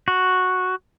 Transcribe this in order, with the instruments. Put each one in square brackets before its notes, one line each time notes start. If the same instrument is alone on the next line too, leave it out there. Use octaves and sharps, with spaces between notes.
[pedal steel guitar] F#4